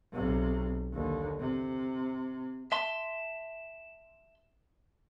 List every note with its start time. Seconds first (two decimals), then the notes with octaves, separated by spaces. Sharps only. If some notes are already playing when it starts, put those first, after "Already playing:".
0.13 B1 C3
0.93 D#2 D3
1.39 C3
2.72 E5 A5 C6